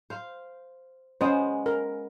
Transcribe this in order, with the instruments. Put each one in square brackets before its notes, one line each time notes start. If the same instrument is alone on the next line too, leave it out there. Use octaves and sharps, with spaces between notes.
[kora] C5 F5
[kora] G#3 B3 [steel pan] C#4 C5
[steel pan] A#4